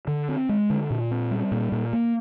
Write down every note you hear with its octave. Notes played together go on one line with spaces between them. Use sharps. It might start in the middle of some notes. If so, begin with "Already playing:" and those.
D3
C4
G#3
D3
A#2
C4
G3
A#2
A#2
A#3